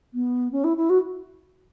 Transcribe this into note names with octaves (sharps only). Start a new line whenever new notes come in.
B3
C#4
E4
E4
F#4